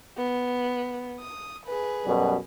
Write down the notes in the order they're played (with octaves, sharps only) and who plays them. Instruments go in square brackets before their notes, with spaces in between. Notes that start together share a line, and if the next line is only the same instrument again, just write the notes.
[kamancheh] B3
D#6
G#4 B4
[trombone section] F#2 B2 G3